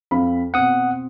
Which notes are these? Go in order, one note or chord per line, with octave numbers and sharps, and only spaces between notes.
F2 F5 B5
B2 C4 F#5 D#6